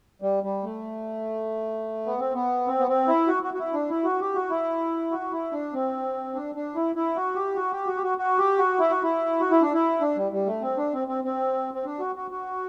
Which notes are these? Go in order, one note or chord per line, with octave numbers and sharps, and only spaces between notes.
G3
G3
A3
B3
C4
B3
C4
B3
C4
E4
F#4
F#4
F#4
E4
D4
E4
F#4
G4
F#4
E4
F#4
E4
D4
C4
D4
D4
E4
E4
F#4
G4
F#4
G4
F#4
G4
F#4
F#4
G4
F#4
E4
F#4
E4
F#4
E4
D4
E4
D4
G3
G3
A3
C4
D4
C4
C4
C4
C4
D4
F#4
F#4
F#4